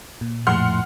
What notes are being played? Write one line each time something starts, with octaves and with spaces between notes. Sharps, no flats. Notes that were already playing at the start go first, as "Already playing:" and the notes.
A#2
F2 A2 F#5 C6 F6